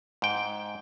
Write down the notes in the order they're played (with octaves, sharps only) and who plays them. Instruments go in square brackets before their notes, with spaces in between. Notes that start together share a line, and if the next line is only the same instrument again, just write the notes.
[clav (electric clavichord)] G#2 G5